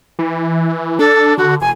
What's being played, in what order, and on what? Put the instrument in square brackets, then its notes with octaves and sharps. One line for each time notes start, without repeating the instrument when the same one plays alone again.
[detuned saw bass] E3
[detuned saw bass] D4 [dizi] A4
[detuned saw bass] D3 [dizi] F#4
[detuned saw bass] F1 [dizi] G#5